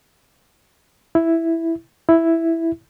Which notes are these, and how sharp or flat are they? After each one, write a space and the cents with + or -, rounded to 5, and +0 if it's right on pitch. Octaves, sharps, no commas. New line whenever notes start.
E4 +0
E4 +0